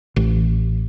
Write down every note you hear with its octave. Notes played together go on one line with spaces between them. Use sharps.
A1